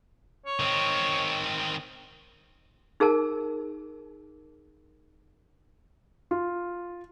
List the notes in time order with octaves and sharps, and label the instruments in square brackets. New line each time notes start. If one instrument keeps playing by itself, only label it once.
[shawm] C#5
[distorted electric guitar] D#3 C4
[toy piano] D#4 G#4 A#4 A5
[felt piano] F4